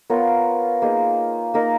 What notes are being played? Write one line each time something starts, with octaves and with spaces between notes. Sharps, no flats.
B3 F4 A#4 C#5
A#3 D#4 G#4
A#3 D#4 A#4